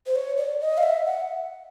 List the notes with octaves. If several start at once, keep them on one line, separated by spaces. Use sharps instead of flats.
C5
C#5
D5
D#5
F5
E5
F#5